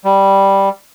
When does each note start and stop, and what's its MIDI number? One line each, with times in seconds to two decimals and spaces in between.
0.05 0.69 55